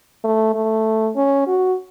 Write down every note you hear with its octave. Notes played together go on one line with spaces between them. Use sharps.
A3
A3
C#4
F#4